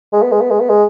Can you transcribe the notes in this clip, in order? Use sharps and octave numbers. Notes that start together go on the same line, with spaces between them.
G#3
B3
G#3
B3
G#3
B3
G#3